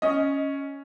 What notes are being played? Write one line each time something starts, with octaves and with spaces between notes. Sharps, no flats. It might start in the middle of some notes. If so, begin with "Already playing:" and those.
C#4 D#5